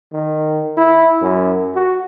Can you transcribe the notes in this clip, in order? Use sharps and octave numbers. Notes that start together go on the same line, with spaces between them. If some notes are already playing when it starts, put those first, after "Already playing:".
D#3
E4
F#2
F#4